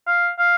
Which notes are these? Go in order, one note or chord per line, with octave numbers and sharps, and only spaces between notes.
F5
F5